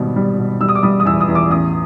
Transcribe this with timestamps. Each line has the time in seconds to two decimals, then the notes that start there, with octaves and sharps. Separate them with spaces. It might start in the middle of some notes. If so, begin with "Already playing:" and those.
Already playing: G#1 B2 G3
0.16 G3
0.38 B2
0.61 G3 E6
0.69 D#6
0.75 D6
0.83 G3 D#6
1.00 D#6
1.05 E2 E6
1.20 D#6
1.28 E2
1.35 D6
1.50 A1 D#6